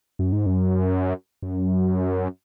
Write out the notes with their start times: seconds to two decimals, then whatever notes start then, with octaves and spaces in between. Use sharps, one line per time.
0.19 F#2
0.32 G#2
0.46 F#2
1.43 F#2